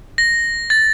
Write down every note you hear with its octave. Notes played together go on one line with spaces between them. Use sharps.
A#6
A6